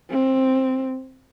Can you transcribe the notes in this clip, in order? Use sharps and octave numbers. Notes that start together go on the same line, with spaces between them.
C4